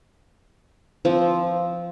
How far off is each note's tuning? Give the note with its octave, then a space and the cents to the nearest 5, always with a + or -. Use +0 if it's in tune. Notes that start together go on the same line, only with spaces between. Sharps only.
F3 -10 C4 +0